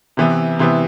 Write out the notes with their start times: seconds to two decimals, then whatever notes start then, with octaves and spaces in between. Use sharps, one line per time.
0.17 C3 E3 B3
0.59 C3 E3 B3